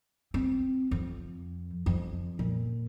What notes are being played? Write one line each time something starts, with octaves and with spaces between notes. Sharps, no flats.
C4
F2
F2
A#2